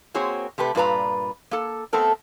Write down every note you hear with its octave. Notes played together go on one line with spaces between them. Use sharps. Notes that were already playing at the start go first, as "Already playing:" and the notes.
A#3 C4 F#4 G#4 C#5
C3 A3 G4 B4
G2 A#2 F4 B4 D5 A#5
A#3 A4
A3 B3 C4 A4 A#4